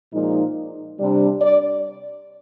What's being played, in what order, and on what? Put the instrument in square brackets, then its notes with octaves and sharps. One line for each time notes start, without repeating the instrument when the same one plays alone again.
[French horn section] A#2 F3 G#3 D#4
C3 G3 D4
D5